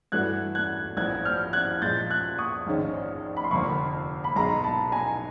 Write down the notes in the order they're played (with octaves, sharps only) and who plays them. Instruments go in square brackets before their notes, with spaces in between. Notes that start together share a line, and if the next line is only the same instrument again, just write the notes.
[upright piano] G2 E3 A3 D4 F#4 [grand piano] F#6 G#6
[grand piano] F#6 G#6
[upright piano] A#1 A2 F3 [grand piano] F#6 G#6
[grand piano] F6 G6
F#6 G#6
[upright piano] A#2 F3 G#3 [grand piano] G6 A6
[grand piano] F#6 G#6
C#6 D#6
[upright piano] A#1 G#2 D#3 G#3 C#4
[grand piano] B5
C6
[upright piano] F1 F2 D3 F3 A#3 [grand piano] B5 C#6
[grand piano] B5
[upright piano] B1 B2 G#3 [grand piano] A#5 C6
[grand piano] A5 B5
G#5 A#5